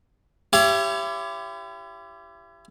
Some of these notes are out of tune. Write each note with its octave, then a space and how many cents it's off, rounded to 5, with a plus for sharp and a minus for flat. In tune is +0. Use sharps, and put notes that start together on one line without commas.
E4 +40 G4 +0 C#5 +15